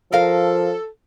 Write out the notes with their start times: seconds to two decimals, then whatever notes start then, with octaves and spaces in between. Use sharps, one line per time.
0.12 F3 A4 A#4 F5